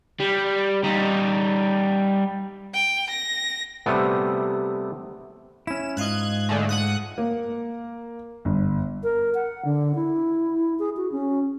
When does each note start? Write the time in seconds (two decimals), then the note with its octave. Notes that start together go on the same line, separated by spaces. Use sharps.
0.20 G3
0.84 G3 D#4
2.74 G5
3.10 A#6
3.86 C3 G3 A3 B3
5.67 C#4 E4 E7
5.97 G#2 F4 D#5 F#6 G#6
6.49 D3 G#3 A3
6.69 F#5 D#6 F#6
7.18 A#3
8.45 G1
9.03 A#4
9.35 F#5
9.65 D3
9.95 E4
10.79 G#4
10.97 F#4
11.12 C#4